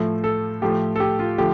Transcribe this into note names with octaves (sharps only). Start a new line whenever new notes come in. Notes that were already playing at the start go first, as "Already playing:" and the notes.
Already playing: A2 F3 A3
A4
A2 F3 A3 G4
A4
G4
F4
D3 F3 A3 G4